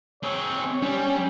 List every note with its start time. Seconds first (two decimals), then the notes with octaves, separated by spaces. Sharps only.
0.23 C4 G#4 C#5
0.82 G3 C#4